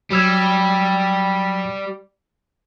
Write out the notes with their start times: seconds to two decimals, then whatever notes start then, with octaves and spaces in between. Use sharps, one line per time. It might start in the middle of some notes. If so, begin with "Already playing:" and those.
0.12 F#3 G3 E6 G#6